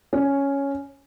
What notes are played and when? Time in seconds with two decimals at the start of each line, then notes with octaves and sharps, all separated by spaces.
0.13 C#4